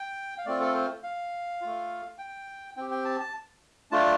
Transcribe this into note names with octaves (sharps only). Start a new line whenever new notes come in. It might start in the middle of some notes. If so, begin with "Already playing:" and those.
Already playing: G5
F5
A3 C4 F4 D5
A4
C5
F5
A3 F4
G5
C4 G4 G5
G5
A5
A5
A3 D4 F4 A5